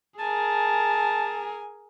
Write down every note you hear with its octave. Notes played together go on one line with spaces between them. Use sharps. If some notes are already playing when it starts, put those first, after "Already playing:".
G#4 A#4 G#5 A5